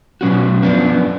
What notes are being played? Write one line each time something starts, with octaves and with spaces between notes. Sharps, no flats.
B2 F#3 C#4 F#4
F#2 F3 B3 D4